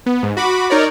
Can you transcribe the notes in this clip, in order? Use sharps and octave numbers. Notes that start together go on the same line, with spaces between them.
B3
G#2
F#4 B5 D6
D#4 A#4 C#5 D5